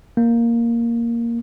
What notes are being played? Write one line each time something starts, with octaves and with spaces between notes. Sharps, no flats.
A#3